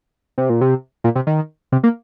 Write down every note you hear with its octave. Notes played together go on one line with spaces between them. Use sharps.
C3
A#2
C3
A#2
C3
D#3
C3
A#3